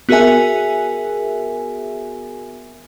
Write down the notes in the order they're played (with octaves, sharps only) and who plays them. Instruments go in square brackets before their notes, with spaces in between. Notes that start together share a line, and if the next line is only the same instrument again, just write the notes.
[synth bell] B3 F#4 G#4 A#4 E5 G#5